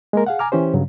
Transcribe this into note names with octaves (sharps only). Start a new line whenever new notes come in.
G#3 A#3 A#4
G#4 F5 F#5
G#5 A#5 D6 F6
E3 C#4 G4 C5
G2 C#3 F#3